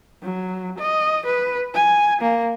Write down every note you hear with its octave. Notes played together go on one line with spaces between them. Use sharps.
F#3
D#5
B4
G#5
A#3